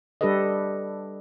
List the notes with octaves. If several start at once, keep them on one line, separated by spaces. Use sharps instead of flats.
G3 D4 G4 A4 B4 D#5